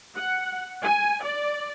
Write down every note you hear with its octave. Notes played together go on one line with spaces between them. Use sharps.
F#5
G#5
D5